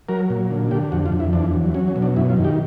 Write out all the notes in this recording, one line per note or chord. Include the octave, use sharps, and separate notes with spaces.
F#3 A#4
A#2
D3
D3 G4
F2 F#4
F4
F2
E4
E2 D4
F#3
F#3 C#4
C#4
B2
D4
F#2 E4
F4
D#3
G4